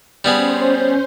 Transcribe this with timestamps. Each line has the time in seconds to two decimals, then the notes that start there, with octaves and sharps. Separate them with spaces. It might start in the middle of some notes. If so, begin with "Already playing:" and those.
0.24 G3 B3 C#4 G#4 C5